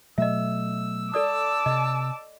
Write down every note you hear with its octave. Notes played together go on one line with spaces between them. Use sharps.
B2 F#3 A3 D#5 E5 E6
A4 D5 A5 D6 D#6
C3 D#5